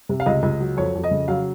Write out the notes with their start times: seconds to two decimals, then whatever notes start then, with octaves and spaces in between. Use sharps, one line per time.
0.09 C3
0.20 F5
0.26 C#2 D#5
0.43 C#2
0.60 F#3
0.77 F2 C#5
0.95 F2
1.04 D#5
1.11 C#3
1.28 F#3 F5